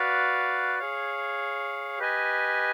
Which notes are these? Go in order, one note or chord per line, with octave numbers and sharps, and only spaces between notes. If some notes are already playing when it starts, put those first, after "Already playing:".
Already playing: F#4 B4 D5 F5
G#4 C#5 F5
G4 B4 D#5 G#5